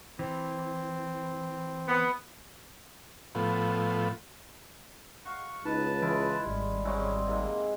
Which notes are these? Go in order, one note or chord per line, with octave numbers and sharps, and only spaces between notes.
E3 C4
B3
A2 F3 B3
F#4 F5 C#6
C#2 D#4 B4 A5
E3 G#3 E4 F4
G#1 G3
F#3 G#3 C4 C#4 E4
G#2 C3 A#3